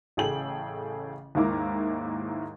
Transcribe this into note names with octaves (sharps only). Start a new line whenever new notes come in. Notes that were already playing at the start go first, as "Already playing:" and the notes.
A1 C#3 G#4 A4 G5 F#7
D#2 G#2 A#3 E4 A#5 D6